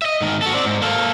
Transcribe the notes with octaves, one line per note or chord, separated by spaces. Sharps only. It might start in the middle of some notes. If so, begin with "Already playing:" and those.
D#5 E5
G#2 D#3
F#4 A4
C4 D5
G#2
A#3 A4